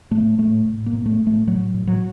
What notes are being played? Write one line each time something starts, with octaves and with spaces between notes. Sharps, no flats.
A2 A3
A2 A3
A2
A#3
A2
A3
A2
A3
A2 F#3
A2
F#3